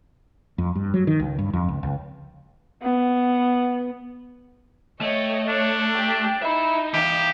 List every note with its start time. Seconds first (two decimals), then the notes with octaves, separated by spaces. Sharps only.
0.58 F2
0.75 G2
0.94 F#3
1.07 D#3
1.20 C#2
1.38 G2
1.53 F2
1.68 C#2
1.83 C#2
2.82 B3
5.01 A3 C#5 D#5 G5
5.49 D4 C#5
5.95 G4
6.42 D#4 E5 B5
6.94 E3 G4 F5